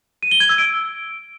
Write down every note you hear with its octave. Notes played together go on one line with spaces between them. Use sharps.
D#7
G7
G#6
E6
D7